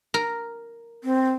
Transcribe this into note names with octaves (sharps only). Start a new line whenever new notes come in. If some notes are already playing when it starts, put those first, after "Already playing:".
A#4
C4